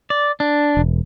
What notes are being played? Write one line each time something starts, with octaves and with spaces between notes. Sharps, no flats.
D5
D4
E1